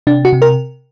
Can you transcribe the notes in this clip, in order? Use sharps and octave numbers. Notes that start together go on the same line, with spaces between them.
C3 D4
F#4
C3
A#4